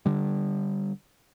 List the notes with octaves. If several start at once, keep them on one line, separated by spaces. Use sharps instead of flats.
D3 G3